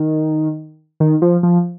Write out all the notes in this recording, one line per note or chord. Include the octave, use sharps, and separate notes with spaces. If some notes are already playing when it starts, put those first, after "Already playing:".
Already playing: D#3
D#3
F3
F3